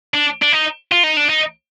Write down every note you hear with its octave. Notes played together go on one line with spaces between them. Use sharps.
D4
D4
D#4
F4
D#4
D4
D#4